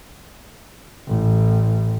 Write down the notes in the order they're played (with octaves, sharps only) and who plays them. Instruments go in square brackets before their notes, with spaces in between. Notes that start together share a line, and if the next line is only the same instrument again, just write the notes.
[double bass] A1